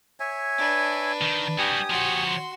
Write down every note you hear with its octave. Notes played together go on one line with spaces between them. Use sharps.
C#5 E5 G#5
D4 B4
D#3
G3 F#4 G4 G#5 D#6
F3 F#4 C#5 C6